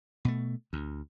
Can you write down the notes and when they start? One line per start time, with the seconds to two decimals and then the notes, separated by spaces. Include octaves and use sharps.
0.25 B2 A3
0.73 D2